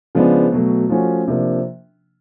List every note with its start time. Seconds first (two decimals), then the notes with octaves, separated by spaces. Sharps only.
0.15 C#3 F3 G#3 B3 D4
0.52 B2 F#3 A3
0.90 F3 A3 C#4 F#4
1.28 C3 F3 A#3 D4